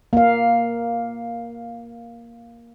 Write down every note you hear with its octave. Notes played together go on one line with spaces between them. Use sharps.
A#3 F5